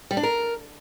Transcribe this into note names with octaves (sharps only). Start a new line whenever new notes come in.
G3
D4
A#4